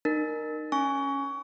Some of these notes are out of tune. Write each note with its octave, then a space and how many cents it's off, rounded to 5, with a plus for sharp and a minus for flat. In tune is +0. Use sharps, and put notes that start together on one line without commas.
D#4 -35 A#4 +0
C#4 +0 G#5 +0 C#6 +25